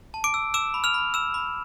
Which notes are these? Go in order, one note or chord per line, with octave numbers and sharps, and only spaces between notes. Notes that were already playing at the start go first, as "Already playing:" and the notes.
A5
D6 D7
E6
D6 E6 E7
B5
F6 F7
B5
E6 E7
B5